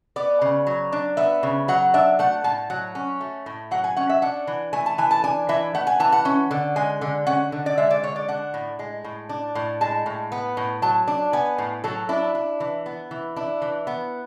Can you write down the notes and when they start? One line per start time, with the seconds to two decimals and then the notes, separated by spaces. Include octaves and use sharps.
0.16 B3 D5
0.42 C#3
0.67 F#3
0.92 D4
1.17 B3 E5
1.43 C#3
1.68 F#3 F#5
1.94 D4 E5
2.19 A3 F#5
2.44 A2 A5
2.70 F#3 F#5
2.95 C#4
3.20 A3
3.46 A2
3.71 F#3 F#5
3.84 G#5
3.97 C#4 F#5
4.10 E5
4.22 D4 F#5
4.47 E3
4.73 A3 G#5
4.86 A5
4.98 E3 G#5
5.11 A5
5.24 D4 G#5
5.49 E3 E5
5.74 A3 F#5
5.87 G#5
6.00 E3 A5
6.12 F#5
6.25 C#4
6.51 D3
6.76 G#3 G#5
7.01 D3
7.27 C#4 F#5
7.52 D3
7.66 D5
7.78 G#3 E5
7.91 D5
8.03 D3 C#5
8.16 D5
8.28 D4 F#5
8.54 A2
8.79 G#3
9.04 A2
9.29 D4
9.55 A2
9.81 G#3 A5
10.06 A2
10.32 B3
10.57 A2
10.82 F#3 A5
11.08 D4
11.33 B3 G#5
11.58 A2
11.84 F#3 A4
12.09 D4 E4
12.35 D4
12.60 E3
12.86 B3
13.11 E3
13.36 D4 E4
13.62 E3
13.87 B3